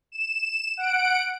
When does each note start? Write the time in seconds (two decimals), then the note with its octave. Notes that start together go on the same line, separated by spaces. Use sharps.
0.12 E7
0.77 F#5 D7